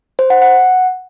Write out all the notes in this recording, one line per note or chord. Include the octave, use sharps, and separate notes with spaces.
C5
F#5
F#5